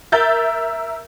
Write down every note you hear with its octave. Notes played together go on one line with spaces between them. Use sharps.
A#4 E5 G6 A6